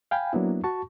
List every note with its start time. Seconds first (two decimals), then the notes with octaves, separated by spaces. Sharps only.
0.11 F5 G5 G#5 B5
0.33 F#3 A#3 B3 D4 E4
0.64 F#4 A5 C#6